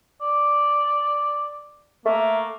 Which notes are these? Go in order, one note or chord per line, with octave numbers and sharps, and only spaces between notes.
D5
A3 A#3